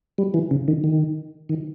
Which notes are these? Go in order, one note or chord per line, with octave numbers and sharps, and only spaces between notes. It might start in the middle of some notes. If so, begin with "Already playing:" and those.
G3
E3
C#3
D#3
D#3
D#3